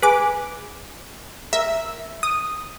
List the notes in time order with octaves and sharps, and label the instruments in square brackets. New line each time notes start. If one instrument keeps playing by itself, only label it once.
[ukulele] G#4 [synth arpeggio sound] B4 D6
[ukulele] A#4 [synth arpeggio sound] E5
[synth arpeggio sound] D#6